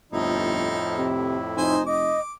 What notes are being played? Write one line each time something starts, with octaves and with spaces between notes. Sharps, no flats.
G1 F2 A2 F3 D#4 E4
C3
F1 D#4 C5 G#5
D#5 D6